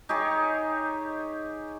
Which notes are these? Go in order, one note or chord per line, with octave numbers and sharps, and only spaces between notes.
D#4 G4 G#4 C#5